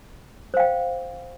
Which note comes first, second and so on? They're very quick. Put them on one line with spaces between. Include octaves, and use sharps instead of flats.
C5 F5 G5